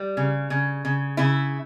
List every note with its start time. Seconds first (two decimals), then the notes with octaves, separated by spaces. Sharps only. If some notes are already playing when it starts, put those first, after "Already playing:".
Already playing: G3
0.17 C#3
0.50 C#3
0.85 C#3
1.17 C#3 E4